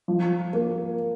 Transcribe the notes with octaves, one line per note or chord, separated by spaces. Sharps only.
F3
A#3